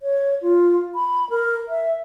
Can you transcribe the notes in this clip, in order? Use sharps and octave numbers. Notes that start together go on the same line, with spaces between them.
C#5
F4
B5
A#4
E5